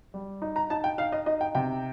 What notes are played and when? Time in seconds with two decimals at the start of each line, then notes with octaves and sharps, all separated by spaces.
0.14 G3
0.42 D#4
0.56 A#5
0.70 D#4 A5
0.84 G5
0.98 D#4 F5
1.12 D#5
1.26 D#4 D#5
1.41 G5
1.55 C3 G5